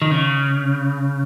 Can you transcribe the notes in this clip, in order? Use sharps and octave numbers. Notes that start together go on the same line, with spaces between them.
D#3
C#3